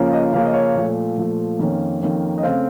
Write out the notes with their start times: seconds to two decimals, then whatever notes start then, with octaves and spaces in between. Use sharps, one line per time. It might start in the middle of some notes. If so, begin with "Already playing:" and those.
Already playing: C#3 F3 A#3 C#4
0.13 D#5
0.33 C#3 F3 A#3 C#4 F5
0.45 D#5
0.54 C#5
0.75 A#2 F3 A3
1.18 A#2 F3 A3
1.59 F2 D#3 A#3 C#4
2.01 F2 D#3 A#3 C#4
2.38 D#5
2.43 C#3 A3 C4 F5